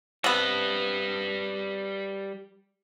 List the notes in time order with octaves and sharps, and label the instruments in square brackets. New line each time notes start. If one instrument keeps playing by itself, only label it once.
[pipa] C3 B3 [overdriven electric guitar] G3 B4